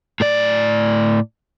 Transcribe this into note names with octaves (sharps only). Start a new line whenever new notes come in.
A2 D5